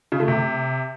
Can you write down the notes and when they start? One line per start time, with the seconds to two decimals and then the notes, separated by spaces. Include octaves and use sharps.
0.12 C#3
0.20 A3
0.28 C3